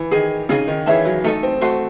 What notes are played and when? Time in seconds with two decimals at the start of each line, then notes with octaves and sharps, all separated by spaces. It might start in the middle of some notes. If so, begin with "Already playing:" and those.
Already playing: E3
0.11 D#3 G#4 D#5 G#5
0.49 C#3 D#4 G#4 D#5 G#5
0.67 D#3
0.86 E3 G#4 C#5 E5 A5
1.05 F#3
1.24 A3 D#4 A4 D#5
1.43 C4
1.61 A3 F#4 C5 D#5